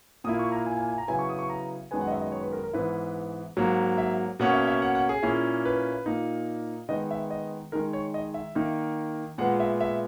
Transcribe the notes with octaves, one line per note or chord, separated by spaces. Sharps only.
A#2 A#3 E4 D#6
C#6
A#5
G#5
G#5
G#5
A#5
C#3 F#3 B3 E4 G#5
C#6
D#6
C#6
A#5
F#2 D#3 G#3 B3 G#5
F#5
D#5
E5
D#5
C#5
B4
A#4
A#4
G#2 E3 B3 E4 B4
G#2 F#3 A#3
E5
B2 A#3 C#4 F#5
E5
E5
F#5
F#5
G#4
A#2 A#3 C#4 E4
B4
A#2 A#3 D#4
D#3 G#3 B3 D#4 D#5
E5
D#5
D#3 G#3 D#4 A#4
C#5
D#5
E5
D#3 A#3 D#4
A#2 G#3 B3 F#5
E5
E5